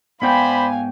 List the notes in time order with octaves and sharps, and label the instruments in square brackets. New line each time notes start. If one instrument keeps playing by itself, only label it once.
[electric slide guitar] G#2 B3 G5 [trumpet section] C5 D5 B5 [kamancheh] F5 G#5